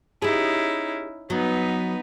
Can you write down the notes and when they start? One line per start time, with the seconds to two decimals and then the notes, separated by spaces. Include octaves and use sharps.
0.22 C#4 D#4 E4 G4 G#4
1.30 F#3 B3 D#4 B4